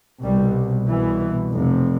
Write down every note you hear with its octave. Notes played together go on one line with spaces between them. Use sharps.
C2 B2 G3
C2 B2 E3
F1 F2 C3